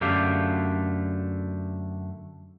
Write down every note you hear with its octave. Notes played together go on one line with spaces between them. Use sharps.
F#2 D3 A3 G4 F5